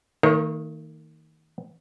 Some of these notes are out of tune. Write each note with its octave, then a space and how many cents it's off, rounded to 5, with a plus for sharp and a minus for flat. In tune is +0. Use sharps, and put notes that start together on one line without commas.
D#3 +20 A#3 -40 C#5 -30